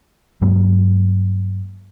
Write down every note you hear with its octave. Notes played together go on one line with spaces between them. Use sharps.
G2 F#3 G#3 A#3